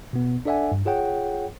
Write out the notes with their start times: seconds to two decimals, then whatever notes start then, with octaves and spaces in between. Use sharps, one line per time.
0.13 B2 B3
0.45 D4 A4 D5 E5 F#5 G#5
0.72 G2
0.85 F4 G#4 C#5 F#5 G5